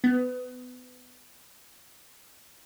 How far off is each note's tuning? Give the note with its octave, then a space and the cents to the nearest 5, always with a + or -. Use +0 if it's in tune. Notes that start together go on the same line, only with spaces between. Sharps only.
B3 +25